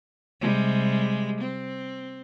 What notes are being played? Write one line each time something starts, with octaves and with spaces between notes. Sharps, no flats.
C3 G3 G#3
C4